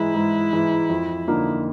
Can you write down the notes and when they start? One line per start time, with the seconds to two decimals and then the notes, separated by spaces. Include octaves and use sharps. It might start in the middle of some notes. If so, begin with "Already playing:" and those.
Already playing: G#2 E3 G#3 E4
0.14 G#2
0.53 E3 G#3
0.90 F2
1.27 D3 F3 A#3 D#4